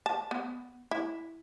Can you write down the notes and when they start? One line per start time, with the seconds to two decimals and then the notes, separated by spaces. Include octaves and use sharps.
0.06 A5
0.31 B3
0.91 E4